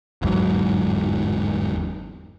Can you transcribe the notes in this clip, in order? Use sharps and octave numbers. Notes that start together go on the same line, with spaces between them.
G1 E2 G#2 F#3